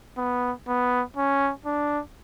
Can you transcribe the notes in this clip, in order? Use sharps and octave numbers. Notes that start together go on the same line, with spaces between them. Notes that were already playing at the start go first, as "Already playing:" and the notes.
B3
B3
C#4
D4